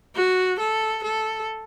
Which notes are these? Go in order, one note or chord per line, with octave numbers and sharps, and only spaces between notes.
F#4
A4
A4